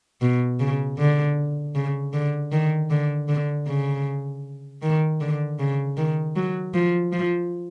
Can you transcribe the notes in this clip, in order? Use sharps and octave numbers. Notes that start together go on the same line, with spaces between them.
B2
C#3
D3
C#3
D3
D#3
D3
D3
C#3
D#3
D3
C#3
D#3
F#3
F3
F3